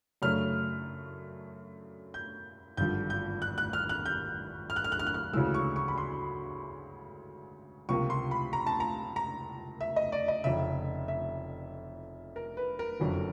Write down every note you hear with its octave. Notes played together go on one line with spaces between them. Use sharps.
F#2 C#3 F#3 A3 D4 F6
G6
G#1 G2 D3 F3 G6
G6
F#6
F#6
F6
F#6
G6
F6
F#6
F6
F#6
F6
F#6
F6
D2 C#3 E3 G#3 E6
C#6
C#6
B5
C6
C#2 C3 F3 A#3 C#6
C6
B5
A#5
A5
A#5
A#5
E5
D#5
D5
D#5
F1 F2 C#3 E5
E5
A#4
B4
A#4
F#1 F2 D3 F#3